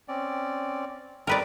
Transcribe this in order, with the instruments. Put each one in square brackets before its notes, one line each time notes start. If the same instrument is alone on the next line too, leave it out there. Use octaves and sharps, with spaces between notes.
[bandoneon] C4 C#4 D5
[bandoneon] C4 D#4 A#5 [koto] A#4 B4 D5